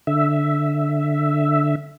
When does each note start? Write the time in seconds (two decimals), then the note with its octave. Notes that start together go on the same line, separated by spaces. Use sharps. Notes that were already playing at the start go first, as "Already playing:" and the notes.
0.07 D3 E5